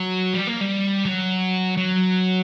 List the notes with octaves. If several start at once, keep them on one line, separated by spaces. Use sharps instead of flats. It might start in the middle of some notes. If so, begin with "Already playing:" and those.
Already playing: F#3
G3
A#3
G3
F#3
F#3